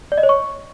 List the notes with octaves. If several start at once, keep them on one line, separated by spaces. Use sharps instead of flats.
D5
D#5
C#5
C#6